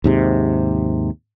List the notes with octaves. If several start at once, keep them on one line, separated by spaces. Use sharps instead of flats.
D#2 G#2 C3